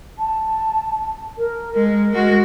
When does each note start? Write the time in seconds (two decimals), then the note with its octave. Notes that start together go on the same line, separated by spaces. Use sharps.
0.19 A5
1.38 A#4
1.74 G#3 A#4
2.13 G#3 F#4